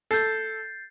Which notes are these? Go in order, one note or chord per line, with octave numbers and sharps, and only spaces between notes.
A4 G6 A6 C7